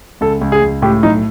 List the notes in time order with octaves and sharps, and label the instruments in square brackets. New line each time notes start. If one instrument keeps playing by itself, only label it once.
[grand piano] C#2 A4
C#2
G#4
C#2
A2 G4
B1 D#4